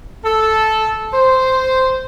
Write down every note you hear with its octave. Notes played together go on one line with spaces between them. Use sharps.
A4
C5